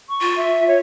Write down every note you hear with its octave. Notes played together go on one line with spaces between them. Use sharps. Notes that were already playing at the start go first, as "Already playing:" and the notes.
C#6
F4
E5
C#5